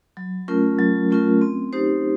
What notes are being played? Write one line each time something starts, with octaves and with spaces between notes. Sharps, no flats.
F#3
A3 C#4 F4 A#4
F#3
A3 C#4 F4 A#4
C4
D#4 G4 C5